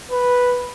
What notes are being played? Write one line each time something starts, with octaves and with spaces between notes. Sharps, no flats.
B4